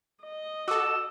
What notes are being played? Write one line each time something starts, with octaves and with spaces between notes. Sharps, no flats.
D#5
F#4 A4 D6 E6 E7